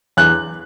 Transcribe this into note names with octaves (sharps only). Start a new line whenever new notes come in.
E2 F#6